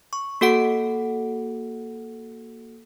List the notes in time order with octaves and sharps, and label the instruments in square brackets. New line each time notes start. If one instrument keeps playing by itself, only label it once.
[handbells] C#6
A#3 F#4 A4 F#5 D7